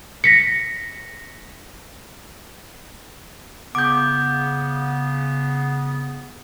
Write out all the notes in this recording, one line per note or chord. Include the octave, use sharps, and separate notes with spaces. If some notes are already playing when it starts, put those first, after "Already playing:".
A#6 B6 C#7
C#3 B3 D6 G6